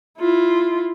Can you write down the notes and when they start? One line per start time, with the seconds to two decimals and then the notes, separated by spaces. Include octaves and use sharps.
0.18 E4 F4